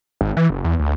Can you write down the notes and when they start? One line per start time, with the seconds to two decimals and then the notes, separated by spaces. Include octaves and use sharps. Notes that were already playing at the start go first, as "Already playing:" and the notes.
0.21 G#1
0.37 E3
0.50 F#1
0.64 E2
0.80 D2